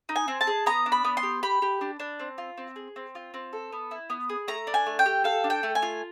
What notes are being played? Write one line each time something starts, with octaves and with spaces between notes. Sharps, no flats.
D#4
G#5
C4
A5
G#4
B3 A#5
D4
B5
B3
C6
G4
G4 B5
G4
D4
D4
C4
F4
C4
G#4
C4
F4
C4
A4
B3
E4
B3
G#4
A3 A#5
D4
G#5
A3
G5
G4
A4 F5
D4
G5
A3
G#5
F4